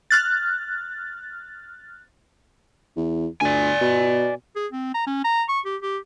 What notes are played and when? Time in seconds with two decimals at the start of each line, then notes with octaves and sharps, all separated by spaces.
0.11 F6 F#6 A6
2.96 E2
3.41 D2 D5 G#5
3.81 B2
4.56 G#4
4.72 C4
4.94 A#5
5.07 C#4
5.24 A#5
5.49 C#6
5.65 G4
5.82 G4